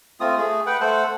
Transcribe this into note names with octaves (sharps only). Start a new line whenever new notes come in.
A3 C4 F4 D#6
A3 G#4
B4 F#5 G5
A3 A4 C5 F#5